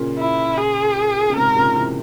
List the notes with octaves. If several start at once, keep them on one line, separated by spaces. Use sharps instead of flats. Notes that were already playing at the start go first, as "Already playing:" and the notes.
Already playing: A#2 C#3
E4
G#4
C#3
G#2 C3 A#4
A#2 C#3
C3 E3